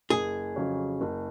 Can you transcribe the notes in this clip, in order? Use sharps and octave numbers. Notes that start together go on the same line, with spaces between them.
F#1 G#4
F2 C#3 F#3 C#4
F#1